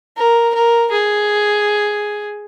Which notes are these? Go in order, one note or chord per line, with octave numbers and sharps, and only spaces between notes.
A#4
A#4
G#4